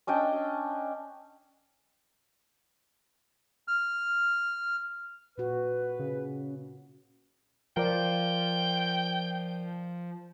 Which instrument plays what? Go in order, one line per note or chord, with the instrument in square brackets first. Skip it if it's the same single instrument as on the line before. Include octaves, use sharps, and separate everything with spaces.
[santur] C#4 D4 D#5 G5
[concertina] F6
[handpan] A#2 F#4 [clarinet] B4
[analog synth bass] C#3
[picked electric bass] F3 [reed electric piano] A#4 C5 D5 [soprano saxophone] G5